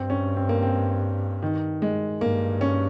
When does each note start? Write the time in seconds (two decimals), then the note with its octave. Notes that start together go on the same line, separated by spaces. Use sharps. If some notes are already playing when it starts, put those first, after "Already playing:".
Already playing: G2 C4
0.10 C#4
0.37 C4
0.49 A#3
0.63 C4
1.42 D#3
1.82 G#3
2.21 G2 A#3
2.61 C#4